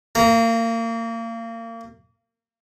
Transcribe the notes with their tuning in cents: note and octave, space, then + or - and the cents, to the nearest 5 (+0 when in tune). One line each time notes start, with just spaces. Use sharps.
A#3 -30 A#5 +0